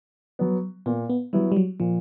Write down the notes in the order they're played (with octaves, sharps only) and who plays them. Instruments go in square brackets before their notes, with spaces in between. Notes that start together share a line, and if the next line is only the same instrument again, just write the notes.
[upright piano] F#3 B3
[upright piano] A#2 [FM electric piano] B3
[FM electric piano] B3
[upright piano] F#3 B3 E4 [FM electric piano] G3
[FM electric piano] G3
F#3
[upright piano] A#2 [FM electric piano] F3